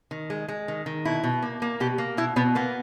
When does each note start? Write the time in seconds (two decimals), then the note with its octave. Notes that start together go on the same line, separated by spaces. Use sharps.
0.11 D#3
0.30 G#3
0.48 G#3
0.68 D#3
0.86 D#3
1.05 B2 E4
1.23 B2
1.42 A#3
1.62 A#3
1.80 B2 G4
1.98 A#3
2.17 B2 E4
2.36 B2 B3
2.55 A#3 B3